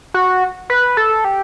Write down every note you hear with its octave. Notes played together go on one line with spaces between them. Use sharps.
F#4
B4
A4
G4